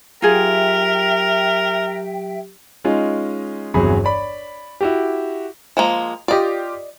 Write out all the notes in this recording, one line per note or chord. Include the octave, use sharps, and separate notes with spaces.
F#3 F4 G4 G#4 A#4 E5 G5
G#3 C#4 D#4 F4
G1 E2 C3 F#3 G#4 B5
C#5 D5 B5
E4 F#4 G4
F3 G#3 A#3
F4 G4 D5 D#5